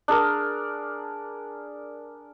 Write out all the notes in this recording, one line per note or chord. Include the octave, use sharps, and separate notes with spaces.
D4 G#4 A#4